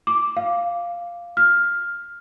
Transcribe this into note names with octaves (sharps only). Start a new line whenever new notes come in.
D6
F5
F6